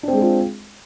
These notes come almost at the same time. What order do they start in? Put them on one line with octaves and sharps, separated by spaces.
D4 C4 G#3 G#4 F4